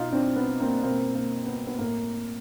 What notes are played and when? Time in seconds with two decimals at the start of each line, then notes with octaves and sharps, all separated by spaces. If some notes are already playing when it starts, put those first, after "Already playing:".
Already playing: B2 D#4 F4
0.12 C4 D4
0.36 B3
0.60 A#3 C4
0.83 B2 A#3 C4
1.15 A#3
1.46 B3
1.67 B3
1.79 A2 A#3